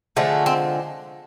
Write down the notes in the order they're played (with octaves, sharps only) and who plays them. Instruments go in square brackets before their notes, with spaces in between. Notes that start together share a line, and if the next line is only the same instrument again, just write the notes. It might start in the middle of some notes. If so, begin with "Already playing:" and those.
[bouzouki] D3 F3 G#3 A3
C4